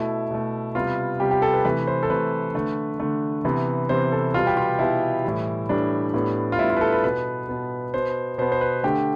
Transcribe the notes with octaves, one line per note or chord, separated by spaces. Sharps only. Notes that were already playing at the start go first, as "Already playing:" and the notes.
Already playing: B2 A3 E4
B2 A3
C3 G3 B3 F4
C3 G3 B3 G4
G4
A4
B4
C3 E3 A3 B4
C5
A4
C3 E3 A3 B4
D3 A3
D3 A3
C3 E3 B3
C3 E3 B3 C5
A4
B2 G3 B3 F4
G4
F4
B2 G3 B3 E4
A2 E3 G3
A2 E3 G3 D4
A2 G3 B3
F4
A2 G3 B3 E4
F4
B4
A4
B4
B2 B3 B4
B2 B3
B2 B3 C5
B2 B3 C5
C5
B4
D3 A3 G4